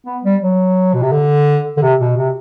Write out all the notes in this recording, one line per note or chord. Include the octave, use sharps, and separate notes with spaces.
B3
G3
F#3
B2
C3
D3
D3
C3
B2
C3